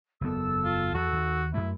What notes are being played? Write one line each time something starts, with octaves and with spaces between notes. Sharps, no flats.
F#1 E2 B3 A4 E6
F4
E2 F#4
D#2
F#2 A3 E4